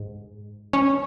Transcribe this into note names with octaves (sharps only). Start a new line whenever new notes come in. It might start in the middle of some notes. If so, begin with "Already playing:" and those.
Already playing: G#2
C#4 C#5